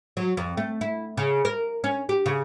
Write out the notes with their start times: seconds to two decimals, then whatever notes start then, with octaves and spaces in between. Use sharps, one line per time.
0.17 F#3
0.37 F2
0.57 A3
0.81 E4
1.17 C#3
1.45 A#4
1.84 C#4
2.09 G4
2.26 C#3